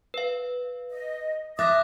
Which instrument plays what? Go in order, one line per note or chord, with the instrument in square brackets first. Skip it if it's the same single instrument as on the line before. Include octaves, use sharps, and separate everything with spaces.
[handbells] B4 F5
[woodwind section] D#5
[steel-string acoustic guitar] E5 [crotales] D6 F#6 A#6 [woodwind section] D#6 [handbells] A6